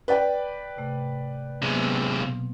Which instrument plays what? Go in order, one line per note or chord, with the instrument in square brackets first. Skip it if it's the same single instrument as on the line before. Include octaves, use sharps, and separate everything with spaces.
[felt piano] B4 D5 G5
[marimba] G#2 C3 A3
[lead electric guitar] C3 G#3 [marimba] F#3 A#3 B3
[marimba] B2 C4 F5